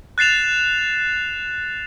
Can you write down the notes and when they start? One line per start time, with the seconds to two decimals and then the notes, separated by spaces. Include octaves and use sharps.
0.18 F#6 A6 C7 E7 F7